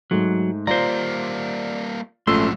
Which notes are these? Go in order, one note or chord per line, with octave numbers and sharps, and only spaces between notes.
G#2 F#3 A3
G3 A#3 F4 C5 D5 A#5
A#1 G#2 F#3 A3 C#4 F4 C6 E6